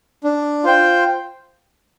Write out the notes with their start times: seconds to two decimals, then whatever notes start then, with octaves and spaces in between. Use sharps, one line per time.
0.24 D4
0.64 F4 C5 G5